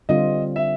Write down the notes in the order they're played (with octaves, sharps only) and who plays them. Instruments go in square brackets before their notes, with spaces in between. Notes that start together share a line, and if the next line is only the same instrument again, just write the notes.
[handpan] D3 G3 C4 F4 [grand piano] D#5
[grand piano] E5